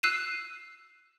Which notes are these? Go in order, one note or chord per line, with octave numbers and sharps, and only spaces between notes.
E6 F#6 C7 D#7 E7